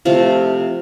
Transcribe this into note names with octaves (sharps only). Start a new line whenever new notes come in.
C3 F3 A3 F4